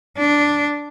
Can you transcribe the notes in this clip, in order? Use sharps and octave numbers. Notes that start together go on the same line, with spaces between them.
D4